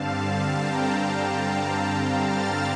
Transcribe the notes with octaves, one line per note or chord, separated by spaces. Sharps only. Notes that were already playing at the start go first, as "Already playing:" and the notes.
Already playing: G2 D3 G3 C4 F5 A5
G5 A#5
G5 A#5
F6 A6